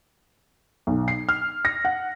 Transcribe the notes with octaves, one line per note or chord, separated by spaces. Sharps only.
B1
C7
F6
A#6
F#5